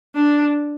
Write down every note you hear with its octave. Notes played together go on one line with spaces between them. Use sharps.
D4